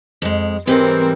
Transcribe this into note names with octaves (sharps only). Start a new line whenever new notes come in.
F2 G#3
G#2 E3 G3 C4 A#4